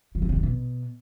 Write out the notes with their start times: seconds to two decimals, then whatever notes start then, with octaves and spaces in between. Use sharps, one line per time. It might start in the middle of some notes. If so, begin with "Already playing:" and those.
0.15 F3
0.22 D#3
0.29 C3
0.36 D#3
0.43 B2